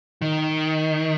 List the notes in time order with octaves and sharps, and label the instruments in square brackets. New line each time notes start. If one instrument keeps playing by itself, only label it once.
[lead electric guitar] D#3